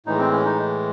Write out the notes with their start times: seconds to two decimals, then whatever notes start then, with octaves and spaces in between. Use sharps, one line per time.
0.06 A2 E3 G#3 D#4
0.19 C4
0.32 C#4
0.45 D#4